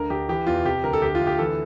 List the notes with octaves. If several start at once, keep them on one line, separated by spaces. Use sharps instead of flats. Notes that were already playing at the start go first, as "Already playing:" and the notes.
Already playing: D2 D3 A#4
D2 G4
E3 G4
E2 F4
C3 G4
D2 A#4
A4
D2 G4
F4
D2
G4
E3 A4